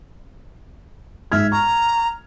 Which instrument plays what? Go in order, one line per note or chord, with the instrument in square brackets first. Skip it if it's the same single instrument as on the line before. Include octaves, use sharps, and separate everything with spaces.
[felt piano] G#2 F6 G#6 [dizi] E5
[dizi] A#5 [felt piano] C#6